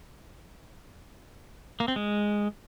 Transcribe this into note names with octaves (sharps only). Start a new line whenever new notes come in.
A#3
C4
G#3